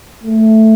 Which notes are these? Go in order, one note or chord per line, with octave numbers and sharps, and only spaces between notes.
A3